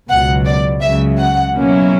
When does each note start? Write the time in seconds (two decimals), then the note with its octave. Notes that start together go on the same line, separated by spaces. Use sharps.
0.09 C#2 B2 F#3 F#5
0.45 D5
0.81 C#2 C#3 F#3 E5
1.17 F#5
1.54 B2 F#3 A#3 C#4 E4